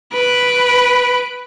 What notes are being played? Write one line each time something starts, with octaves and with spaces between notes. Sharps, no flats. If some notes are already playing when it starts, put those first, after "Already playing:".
B4 D7